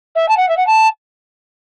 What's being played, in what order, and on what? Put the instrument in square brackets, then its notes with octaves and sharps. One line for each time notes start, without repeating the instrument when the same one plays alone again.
[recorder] E5
A5
F#5
E5
F#5
A5